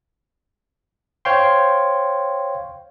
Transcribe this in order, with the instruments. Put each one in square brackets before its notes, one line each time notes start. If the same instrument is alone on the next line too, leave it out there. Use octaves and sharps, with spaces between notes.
[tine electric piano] C5 C#5 F5 G5 C6